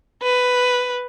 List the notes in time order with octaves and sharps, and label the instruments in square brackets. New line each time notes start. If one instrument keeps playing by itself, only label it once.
[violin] B4